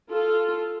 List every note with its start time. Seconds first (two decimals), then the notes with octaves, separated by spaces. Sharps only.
0.11 F4 A4